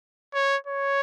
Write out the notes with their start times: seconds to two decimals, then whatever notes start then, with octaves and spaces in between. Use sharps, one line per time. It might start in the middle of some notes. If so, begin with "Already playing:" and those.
0.34 C#5
0.67 C#5